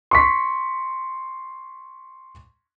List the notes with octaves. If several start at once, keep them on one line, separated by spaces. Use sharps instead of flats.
C6 C#6 B6